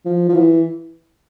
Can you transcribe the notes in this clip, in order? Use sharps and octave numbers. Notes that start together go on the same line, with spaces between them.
F3
F3
E3